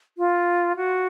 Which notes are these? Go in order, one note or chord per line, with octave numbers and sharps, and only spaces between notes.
F4
F#4